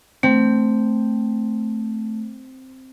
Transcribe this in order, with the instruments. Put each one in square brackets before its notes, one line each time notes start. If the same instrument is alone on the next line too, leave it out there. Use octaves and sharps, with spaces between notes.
[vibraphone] A3 [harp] C4